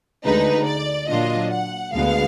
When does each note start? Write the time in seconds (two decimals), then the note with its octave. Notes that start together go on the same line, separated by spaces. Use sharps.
0.25 D2 D3 G#3 D#4 B4
0.67 D5
1.09 A#2 F#3 D4 F4 D#5
1.51 F#5
1.93 D2 D3 G#3 B3 F5